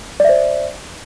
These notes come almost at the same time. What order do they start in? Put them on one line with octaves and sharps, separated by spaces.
D5 E5 C5